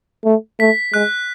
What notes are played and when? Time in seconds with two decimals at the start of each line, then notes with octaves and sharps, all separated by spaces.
0.25 A3
0.59 A3 B6
0.93 G#3 F#6